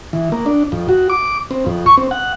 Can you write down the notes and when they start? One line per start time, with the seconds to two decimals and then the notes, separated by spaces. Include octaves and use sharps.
0.13 E3
0.32 A#3
0.46 D4
0.72 F2
0.89 F#4
1.10 D6
1.51 C4
1.66 F2
1.86 C#6
1.98 C4
2.11 F#5